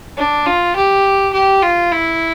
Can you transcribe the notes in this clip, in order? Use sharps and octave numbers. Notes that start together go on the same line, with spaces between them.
D4
F4
G4
G4
F4
E4